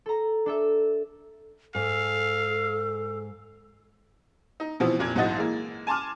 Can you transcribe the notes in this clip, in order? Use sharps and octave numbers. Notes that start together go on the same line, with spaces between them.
A4 A#5
D4 A4 E5
G#2 A4 F5
D#4
B2 E3 F3 B3 C4
F1 A#2 G#6
B1 G#2 E3 F#4 D#5 A6
E3 G#3 A#3
G#5 A5 C6 D6 F6